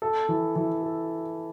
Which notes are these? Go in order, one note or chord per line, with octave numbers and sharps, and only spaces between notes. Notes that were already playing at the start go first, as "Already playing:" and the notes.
A4
E3
E3
A4